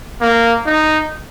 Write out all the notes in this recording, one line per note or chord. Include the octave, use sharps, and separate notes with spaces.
A#3
D#4